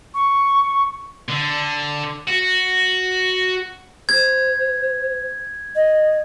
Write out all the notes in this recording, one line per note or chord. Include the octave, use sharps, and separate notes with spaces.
C#6
D3
F#4
C5 G#6
D#5